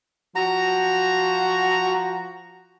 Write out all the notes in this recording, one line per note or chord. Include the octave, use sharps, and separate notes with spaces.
F3 F#4 A#5